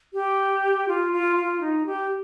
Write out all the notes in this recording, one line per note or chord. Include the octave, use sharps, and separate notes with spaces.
G4
F4
F4
F4
D#4
G4